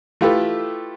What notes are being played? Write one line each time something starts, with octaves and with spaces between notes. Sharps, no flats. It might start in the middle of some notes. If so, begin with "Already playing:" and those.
A3 E4 F4 G4 A4 B4